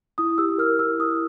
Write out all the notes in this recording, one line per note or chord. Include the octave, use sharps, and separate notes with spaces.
E4 D#6
G4 E6
A#4 F6
E4 E6
E4 D#6